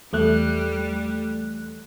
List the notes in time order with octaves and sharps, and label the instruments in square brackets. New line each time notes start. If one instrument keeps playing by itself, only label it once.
[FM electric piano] E2 A3 F#6 [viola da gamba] G3